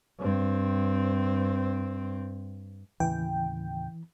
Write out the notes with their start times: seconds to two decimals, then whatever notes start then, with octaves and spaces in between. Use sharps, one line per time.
0.19 G2 C4
3.00 D#2 A2 C#3 E3 G5